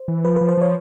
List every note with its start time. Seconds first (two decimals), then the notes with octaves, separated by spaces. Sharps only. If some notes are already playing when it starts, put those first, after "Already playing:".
Already playing: C5
0.08 E3
0.25 F3 B4
0.36 F3 B4
0.49 C5
0.57 F3 C#5